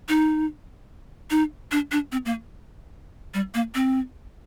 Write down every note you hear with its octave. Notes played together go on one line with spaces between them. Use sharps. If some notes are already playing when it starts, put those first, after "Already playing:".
D#4
D#4
D4
D4
C4
A#3
G3
A#3
C4